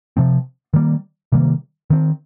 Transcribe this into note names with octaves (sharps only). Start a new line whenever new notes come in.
C3 F3 C4
D#3 G3 A#3
C3 D#3 G3 A#3
D#3 C4